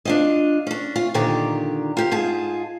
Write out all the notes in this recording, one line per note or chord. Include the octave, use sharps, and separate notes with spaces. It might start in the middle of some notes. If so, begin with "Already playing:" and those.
D4 F4 D#5
C#4 D4
F4
A#2 D3 D#3 G4 D5 A#5
F4 G4
G#2 F4 G#4 A5